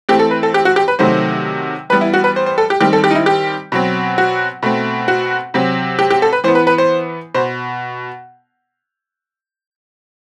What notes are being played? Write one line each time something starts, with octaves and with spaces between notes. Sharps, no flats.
E3 A3 C4 G4
A4
B4
A4
G4
F#4
G4
B4
C3 D#3 F#3 A3 C5
E3 G3 B3 B4
E4
F#4
B4
C5
C5
A4
G4
D#3 G3 C4 G4
A4
G4
D#4
E4
G4
B2 F#3 C4
F#4
B2 A3 C4
F#4
C3 F#3 C4
G4
G4
A4
B4
E3 B3 C5
B4
B4
C5
B2 C5